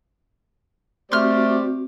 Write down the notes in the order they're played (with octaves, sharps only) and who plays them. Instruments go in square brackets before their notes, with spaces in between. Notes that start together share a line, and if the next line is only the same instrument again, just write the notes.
[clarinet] A3 [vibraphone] C4 F#4 [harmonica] G4 C5 D5 [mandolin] C6 F6